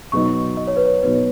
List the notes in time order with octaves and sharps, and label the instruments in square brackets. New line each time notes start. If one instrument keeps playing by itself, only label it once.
[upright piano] B2 F#3 B3 D#4 F#4 [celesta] C#6
[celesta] D#5
C#5
B4
C#5
[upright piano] B2 F#3 B3 D#4 F#4 [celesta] B4